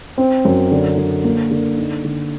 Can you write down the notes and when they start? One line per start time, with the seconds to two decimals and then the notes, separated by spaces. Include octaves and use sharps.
0.18 C4
0.45 F#2
0.71 D3
0.98 D3
1.24 A#3
1.51 D3
1.78 D#4
2.04 D3